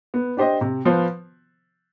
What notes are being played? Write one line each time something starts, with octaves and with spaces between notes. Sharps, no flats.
B3
D4 G4 C5 D#5
C3
F3 B3 F4 C5